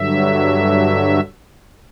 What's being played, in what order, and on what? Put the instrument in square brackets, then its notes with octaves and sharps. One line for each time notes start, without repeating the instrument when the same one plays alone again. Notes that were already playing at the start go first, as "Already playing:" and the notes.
Already playing: [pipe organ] G2 D3 F#3 E5